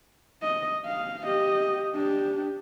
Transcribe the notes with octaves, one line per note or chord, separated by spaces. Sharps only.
D#5
F5
G4 D#5
D4 G4